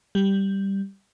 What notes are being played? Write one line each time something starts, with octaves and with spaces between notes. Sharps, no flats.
G3